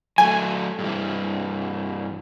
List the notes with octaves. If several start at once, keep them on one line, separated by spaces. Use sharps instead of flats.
F#3 A3 G#5
G2 E3